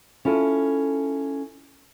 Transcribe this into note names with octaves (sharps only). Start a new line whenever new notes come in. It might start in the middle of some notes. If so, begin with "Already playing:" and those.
C#4 E4 F4 A4